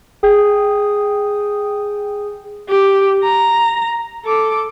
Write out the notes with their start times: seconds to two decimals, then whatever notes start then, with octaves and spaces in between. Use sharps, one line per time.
0.23 G#4 G5 D#6
2.69 G4
3.24 A#5
4.25 A4 D6